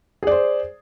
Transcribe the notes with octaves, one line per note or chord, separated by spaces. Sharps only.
G#4 C5 D5